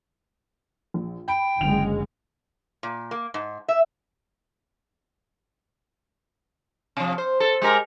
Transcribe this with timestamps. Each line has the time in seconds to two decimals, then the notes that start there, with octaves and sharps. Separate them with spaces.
0.94 A#1
1.28 G5 B5
1.61 F#1 D2 G#3 F7
2.83 A#2
3.11 A#3
3.34 G#2
3.68 E5
6.97 C3 F3
7.18 C5
7.40 A4
7.62 G#3 G4 A#4